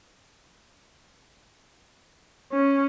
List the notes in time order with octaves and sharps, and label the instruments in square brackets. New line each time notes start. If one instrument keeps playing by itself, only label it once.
[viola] C#4